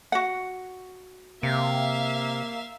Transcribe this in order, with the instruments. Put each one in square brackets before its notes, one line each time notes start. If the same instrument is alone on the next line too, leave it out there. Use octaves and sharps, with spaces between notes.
[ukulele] F#4 F#5
[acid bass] C3 [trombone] A#3 [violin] E5 F5